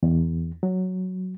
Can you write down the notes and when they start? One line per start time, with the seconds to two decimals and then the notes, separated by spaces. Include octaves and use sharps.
0.03 E2
0.63 F#3